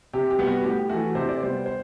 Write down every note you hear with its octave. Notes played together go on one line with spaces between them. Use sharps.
C3 G4
G4
G3 B3
F#4
A2 G4
E3 A3 F#4
C3 C5
D5
G3 B3 C5
C5